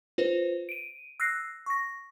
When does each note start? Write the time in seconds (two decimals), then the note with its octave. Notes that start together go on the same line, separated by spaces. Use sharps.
0.18 F4 B4 C5
0.69 D7 D#7
1.20 E6 F#6 A#6 C7
1.66 C#6 A#6